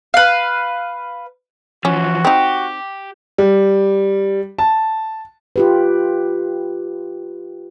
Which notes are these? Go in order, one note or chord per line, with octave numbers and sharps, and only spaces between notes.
B4 F5
E3 F3 C#4 F#4
C4 D#4 G4
G3
A5
F4 G4 B4